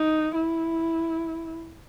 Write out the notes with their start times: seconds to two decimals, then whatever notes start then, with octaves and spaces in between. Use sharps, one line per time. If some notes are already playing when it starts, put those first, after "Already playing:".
Already playing: D#4
0.35 E4